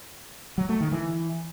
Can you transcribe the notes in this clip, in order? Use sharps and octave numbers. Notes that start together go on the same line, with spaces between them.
F#3
A3
D#3
E3